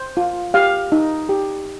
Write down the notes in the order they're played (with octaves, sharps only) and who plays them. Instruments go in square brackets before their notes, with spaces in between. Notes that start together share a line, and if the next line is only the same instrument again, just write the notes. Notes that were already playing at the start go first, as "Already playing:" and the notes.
Already playing: [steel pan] C5
F4
G4 F5
D#4
G4